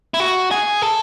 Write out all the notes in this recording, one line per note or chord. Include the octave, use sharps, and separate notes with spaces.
E4
F#4
G#4
A4